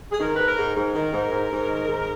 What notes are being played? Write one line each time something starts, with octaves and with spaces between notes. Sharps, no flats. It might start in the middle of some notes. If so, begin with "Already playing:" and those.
G#4
D#3 A#4
G#2 B4
A#4
G#2
G#2 A#4
D#3
G#2
G#2
G#2
D#3
G#2